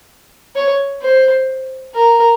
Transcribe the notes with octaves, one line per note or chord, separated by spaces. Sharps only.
C#5
C5
A#4